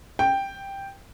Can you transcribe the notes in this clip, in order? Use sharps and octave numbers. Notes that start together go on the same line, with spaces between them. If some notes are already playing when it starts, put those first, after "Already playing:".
G5